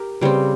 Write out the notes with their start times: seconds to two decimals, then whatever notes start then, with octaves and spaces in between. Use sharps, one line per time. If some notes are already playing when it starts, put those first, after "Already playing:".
Already playing: G4 A#4
0.21 C#3 G3 C4